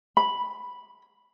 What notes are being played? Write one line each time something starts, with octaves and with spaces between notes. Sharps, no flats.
B5